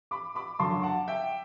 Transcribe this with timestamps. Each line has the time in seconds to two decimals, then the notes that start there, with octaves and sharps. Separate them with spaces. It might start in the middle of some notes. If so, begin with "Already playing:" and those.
0.11 B5 D6
0.36 B5 D6
0.59 F#2 D3 F#3 A5 C6
0.83 F#5 A5
1.08 E5 G5